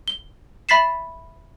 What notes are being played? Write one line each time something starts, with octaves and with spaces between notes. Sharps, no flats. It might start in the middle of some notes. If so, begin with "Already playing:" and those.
G7
E5 B5 A6 B6 C7 E7